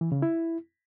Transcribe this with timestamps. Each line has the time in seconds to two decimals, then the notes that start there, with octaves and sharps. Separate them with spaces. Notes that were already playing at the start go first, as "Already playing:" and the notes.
0.01 E3
0.12 C#3
0.22 E4